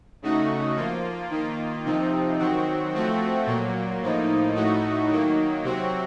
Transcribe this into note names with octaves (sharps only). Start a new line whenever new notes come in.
C#3 A3 D#4 F#4
F3 A#3 F4
D#3 A#3 F4
C3 F3 C4 D#4
D#3 F#3 C4 F#4
F3 A3 C4 F#4
A#2 F#3 A#3
A2 F3 A#3 D#4
A2 A3 D#4 F#4
D#3 F#3 A#3
C3 F#3 C4 F#4